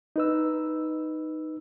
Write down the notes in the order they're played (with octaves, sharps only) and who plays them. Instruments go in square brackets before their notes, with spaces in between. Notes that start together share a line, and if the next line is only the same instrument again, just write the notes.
[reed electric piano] D#4 B4 E6